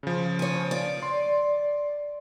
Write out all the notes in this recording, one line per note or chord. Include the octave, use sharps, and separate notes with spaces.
C#3 F3
C#5 G#5
D5
C6